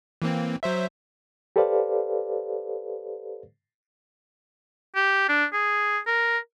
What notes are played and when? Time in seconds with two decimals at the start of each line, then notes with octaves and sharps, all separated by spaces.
0.22 E3 A#3 C4
0.63 F#3 C5 E5
1.56 G4 A4 B4 C5 D5 F5
4.95 G4
5.29 D4
5.53 G#4
6.07 A#4